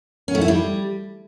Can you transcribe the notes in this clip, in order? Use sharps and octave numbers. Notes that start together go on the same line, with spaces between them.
C#4
A3
E4
G3